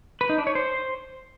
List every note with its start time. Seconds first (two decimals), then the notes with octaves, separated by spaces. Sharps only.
0.21 B4
0.29 D#4
0.38 D4
0.47 C#5
0.55 C5